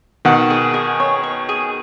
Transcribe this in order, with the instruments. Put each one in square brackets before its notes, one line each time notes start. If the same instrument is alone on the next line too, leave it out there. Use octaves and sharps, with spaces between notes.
[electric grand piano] B2 D#3 [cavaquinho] F#5
[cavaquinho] G#4
G#4
C#5
C#5
G#4